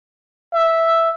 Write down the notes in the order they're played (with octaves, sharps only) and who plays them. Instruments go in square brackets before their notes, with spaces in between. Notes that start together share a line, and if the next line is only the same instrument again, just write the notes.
[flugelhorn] E5